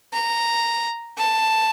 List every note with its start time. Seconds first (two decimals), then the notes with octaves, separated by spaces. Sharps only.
0.13 A#5
1.18 A5